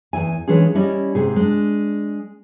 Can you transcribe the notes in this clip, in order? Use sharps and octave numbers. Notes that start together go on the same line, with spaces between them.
E2 G#2 E4 G#5
E3 G#3 C#4 D4 F4 G#4
G3 C#4 E4 D5 D#5
G#2 C3 G#4
G#3 D4